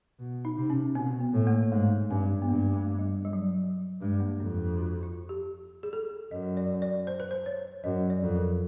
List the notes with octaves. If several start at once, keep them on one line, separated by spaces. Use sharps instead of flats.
B2
D#4
C3
C#4
B2 C4
B3
A2
A#3
G#2 A3
G2 C4
B3
G2 A#3
A3
G3
G3
F#3
F#3
G3
G2 G#3
A#3
F2 D4
F#4
F4
G4
G#4
A4
F#2 D#5
D5
D5
C5
B4
C5
C#5
F#2 D#5
D5
F2
A#4